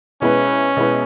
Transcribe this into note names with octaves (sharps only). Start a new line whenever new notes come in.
B2 G#3 B3 C#4 E4 B4
B2 G#3 B3 E4 B4